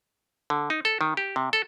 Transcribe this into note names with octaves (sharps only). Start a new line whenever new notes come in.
D3
D#4
A4
D#3
G4
C3
A4